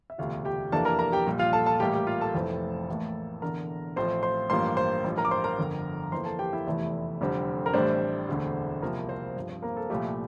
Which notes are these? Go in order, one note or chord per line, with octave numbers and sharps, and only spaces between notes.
E5
E1 D2 C3 F4 F5
G4 G5
F2 C3 E3 A#3 D4 A4 A5
A#4 A#5
A#4 A#5
G4 G5
A#1 A#2 G3
F4 F5
A4 A5
A4 A5
A1 A2 G3 A#3 G4 G5
G4 G5
F4 F5
A4 A5
F1 F2 E3 A3 C4
A1 A2 E3 A#3
E1 E2 D3 A#4 A#5
A1 A2 F3 C4 C5 C6
C5 C6
A1 G2 F3 A#3 C5 C6
C5 C6
A1 G2 F3
A#4 A#5
D6
C5 C6
A#4 A#5
G1 F2 D3
F2 E3 A#3 C5 C6
A4 A5
G4 G5
E4 E5
F1 E2 C3 E3 A3
F1 F2 D3 G3 C4
A#4
A1 A2 G3 C4 D4 C5
E1 D2 D3
C2 C3 F3 A#3 A#4
C4 C5
G2 F3 C4
C4 C5
A#3 A#4
A4
C2 A#2 F3 A3 G4